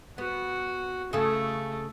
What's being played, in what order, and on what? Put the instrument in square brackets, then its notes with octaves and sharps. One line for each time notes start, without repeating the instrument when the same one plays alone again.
[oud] B3 [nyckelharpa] F#4
[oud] C#3 A4 [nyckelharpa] A3